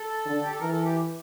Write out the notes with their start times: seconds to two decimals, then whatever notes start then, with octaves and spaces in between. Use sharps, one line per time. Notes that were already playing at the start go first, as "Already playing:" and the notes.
Already playing: A4
0.26 D3
0.42 G4
0.51 A4
0.60 E3 A#4
0.72 A4
0.84 G4